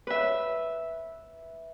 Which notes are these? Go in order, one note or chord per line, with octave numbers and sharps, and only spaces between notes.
B4 E5